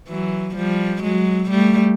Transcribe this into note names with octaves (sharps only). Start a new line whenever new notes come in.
E3 F#3
F3 G3
F#3 G#3
G3 A3